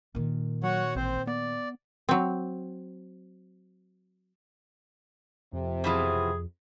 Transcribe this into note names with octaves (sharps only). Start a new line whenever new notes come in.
A#2 D#3
F#3 F#4 C#5 F#5
A1 C4 C5
B3 D5
F#3 C4
F2 C3
B2 E3 F3 G#4